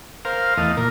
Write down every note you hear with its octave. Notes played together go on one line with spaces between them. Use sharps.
A#4 C5 F5
E2 A3 D#5 F5
A#2 A#4